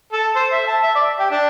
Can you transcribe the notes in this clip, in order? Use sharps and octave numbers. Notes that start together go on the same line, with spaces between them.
A4
C5
E5
A5
E5
D5
G4
D4